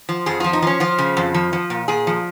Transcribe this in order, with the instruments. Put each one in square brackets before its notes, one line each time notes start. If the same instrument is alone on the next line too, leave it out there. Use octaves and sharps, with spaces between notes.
[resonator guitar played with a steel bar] F3
F2 G#4
F3 F4
D#4
F3 C#4
F3 F4
C#3
F2
F3
F3
A#2
A#2 G#4
F3